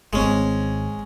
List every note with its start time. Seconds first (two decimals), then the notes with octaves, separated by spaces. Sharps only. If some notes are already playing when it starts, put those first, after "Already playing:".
0.13 G#1 G#3 C4 C#4